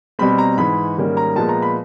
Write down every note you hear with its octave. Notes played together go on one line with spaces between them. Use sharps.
B2 G3 C4 B5
A#5
G#2 E3 G#3 B5
G#2 D#3 G3 A#3 C#4
A#5
A#2 F3 G#3 B3 A5
A#5
B5